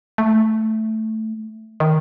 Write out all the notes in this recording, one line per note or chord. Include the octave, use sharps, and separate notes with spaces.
A3
D#3